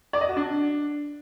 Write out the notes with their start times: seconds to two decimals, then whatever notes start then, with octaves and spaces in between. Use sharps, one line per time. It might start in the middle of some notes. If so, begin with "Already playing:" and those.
0.13 D5
0.21 D#5
0.29 F#4
0.37 D4